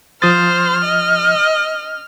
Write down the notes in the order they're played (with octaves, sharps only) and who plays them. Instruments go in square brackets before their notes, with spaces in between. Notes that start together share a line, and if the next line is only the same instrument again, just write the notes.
[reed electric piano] F3 D#6 A6 [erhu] C5 [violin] F6
[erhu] D#5